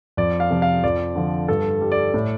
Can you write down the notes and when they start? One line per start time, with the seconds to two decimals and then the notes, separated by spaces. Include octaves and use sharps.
0.17 F2 D5
0.40 F5
0.50 C3 F3
0.62 F5
0.84 F2 D5
1.15 D3 F3
1.48 G2 A4
1.81 G3
1.92 D5
2.14 A2